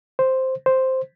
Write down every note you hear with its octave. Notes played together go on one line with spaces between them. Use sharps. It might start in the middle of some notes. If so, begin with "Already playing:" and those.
C5
C5